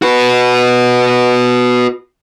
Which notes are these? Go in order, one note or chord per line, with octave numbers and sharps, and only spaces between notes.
F#4 B4